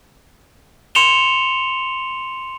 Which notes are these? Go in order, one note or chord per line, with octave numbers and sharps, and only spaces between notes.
C6 C#7 E7 F7 G7